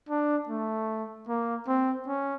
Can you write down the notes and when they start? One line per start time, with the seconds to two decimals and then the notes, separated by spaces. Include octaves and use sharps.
0.09 D4
0.49 A3
1.28 A#3
1.68 C4
2.07 C#4